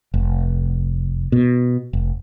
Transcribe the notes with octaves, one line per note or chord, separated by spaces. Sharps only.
F1
B2
F1